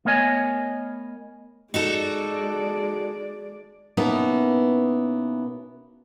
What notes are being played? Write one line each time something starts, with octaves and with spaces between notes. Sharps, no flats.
A3 B3 A#4 C#5 D#5 G#5
G#3 D#4 F#4 A4 D5
B2 A#3 B3 C#4 D#4 E4